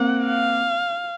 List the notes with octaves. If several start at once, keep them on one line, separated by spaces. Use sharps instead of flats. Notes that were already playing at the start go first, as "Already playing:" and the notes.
Already playing: A#3 C4 F#5
F5